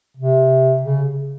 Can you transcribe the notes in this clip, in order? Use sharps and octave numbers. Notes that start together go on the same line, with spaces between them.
C3
C#3